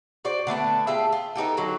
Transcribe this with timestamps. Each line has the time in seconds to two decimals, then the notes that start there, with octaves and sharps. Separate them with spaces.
0.25 F#4 C5 D5
0.47 D3 A3 B3 A5
0.87 F4 G4 G#4 E5
1.12 F4
1.35 B3 D#4 G4 A4
1.57 D3 F#3 D#4